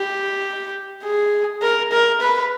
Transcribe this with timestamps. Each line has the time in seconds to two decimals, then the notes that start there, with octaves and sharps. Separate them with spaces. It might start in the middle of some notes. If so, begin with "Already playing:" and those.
Already playing: G4
1.03 G#4
1.62 A#4
1.91 A#4
2.20 B4